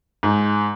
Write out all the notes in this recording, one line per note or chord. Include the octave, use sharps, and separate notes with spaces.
G#2